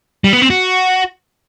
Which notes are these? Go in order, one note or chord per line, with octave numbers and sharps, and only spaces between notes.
G3
B3
C4
F#4